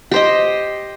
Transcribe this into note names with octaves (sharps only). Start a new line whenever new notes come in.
G4 C5 D#5